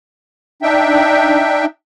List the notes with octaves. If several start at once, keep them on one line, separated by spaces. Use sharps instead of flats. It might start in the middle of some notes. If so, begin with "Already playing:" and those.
D4 D#4 E5 G5